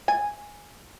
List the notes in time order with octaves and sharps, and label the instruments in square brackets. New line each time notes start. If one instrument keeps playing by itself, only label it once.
[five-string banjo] G#5